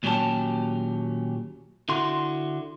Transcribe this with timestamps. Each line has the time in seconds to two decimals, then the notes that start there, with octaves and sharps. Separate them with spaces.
0.03 D#2 A#2 F#3 C#4 G4 A5
1.89 D3 E4 F#4 C6